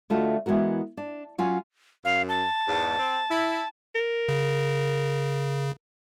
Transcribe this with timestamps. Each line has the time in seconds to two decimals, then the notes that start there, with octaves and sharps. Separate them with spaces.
0.10 D3 A3 F4 F#4 D#5
0.46 E3 G#3 B3 F#4 A#4
0.97 D4
1.38 F#3 C#4 F4 F#5 G#5
2.05 F#2 F5
2.29 A5
2.68 E2 G#2
2.98 C4
3.30 E4
3.95 A#4
4.29 C#3